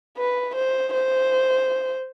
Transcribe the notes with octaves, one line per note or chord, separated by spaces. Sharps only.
B4
C5
C5